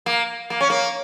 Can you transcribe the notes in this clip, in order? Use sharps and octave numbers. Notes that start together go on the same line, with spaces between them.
A#3
A#3
C#4
A#3